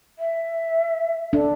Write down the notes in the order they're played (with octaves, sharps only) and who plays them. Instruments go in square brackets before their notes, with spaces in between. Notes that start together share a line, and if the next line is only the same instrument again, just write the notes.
[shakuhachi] E5
[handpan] D4 [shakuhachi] A4